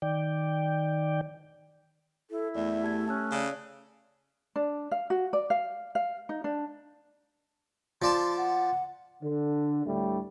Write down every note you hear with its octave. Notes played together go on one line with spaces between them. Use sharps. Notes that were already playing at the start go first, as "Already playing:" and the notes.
D#3 D5 G5
E4 A4
E2 A3 D5 E5
G4 A5 G#6
C#4 A5 E6 F#6
C#3 C#5 D5
D4
F5
F#4
D5
F5
F5
D#4
D4
F3 D5 A5 C6
F#5
D3
D2 A2 G3 A3